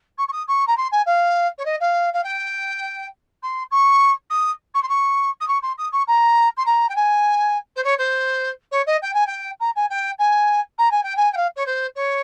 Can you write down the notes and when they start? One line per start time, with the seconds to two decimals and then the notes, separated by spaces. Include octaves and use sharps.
0.18 C#6
0.28 C#6
0.32 D#6
0.48 C#6
0.67 A#5
0.77 C6
0.91 G#5
1.06 F5
1.58 C#5
1.65 D#5
1.80 F5
2.13 F5
2.24 G5
3.43 C6
3.71 C#6
4.30 D#6
4.74 C#6
4.82 C6
4.89 C#6
5.40 D#6
5.48 C#6
5.62 C6
5.78 D#6
5.92 C#6
6.07 A#5
6.57 C6
6.66 A#5
6.89 G5
6.96 G#5
7.76 C5
7.84 C#5
7.98 C5
8.71 C#5
8.86 D#5
9.02 G5
9.14 G#5
9.26 G5
9.60 A#5
9.75 G#5
9.90 G5
10.19 G#5
10.78 A#5
10.91 G#5
11.03 G5
11.16 G#5
11.33 G5
11.37 F5
11.56 C#5
11.66 C5
11.95 C#5